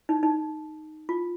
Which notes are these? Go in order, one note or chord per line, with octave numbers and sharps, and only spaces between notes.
D#4
D#4
F4